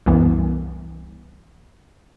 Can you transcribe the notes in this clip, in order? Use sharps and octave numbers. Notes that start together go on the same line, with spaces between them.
C2 F#2 E3 B3